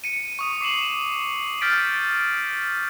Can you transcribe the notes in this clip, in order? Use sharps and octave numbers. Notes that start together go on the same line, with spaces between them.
C#7 D#7
C#6 D#6 D#7
D6 C7 E7 F#7
F6 G6 A6 B6 D7